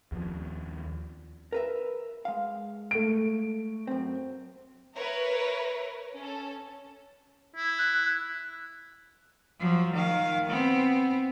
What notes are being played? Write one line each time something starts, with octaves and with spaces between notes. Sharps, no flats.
D#2 F3
A#4 B4 E5
G#3 F5
A3 D7
F#2 C4
A#4 B4 C#5 E5
C#4 A4
E4
F#6
F3 F#3
D#3 F5
B3 C4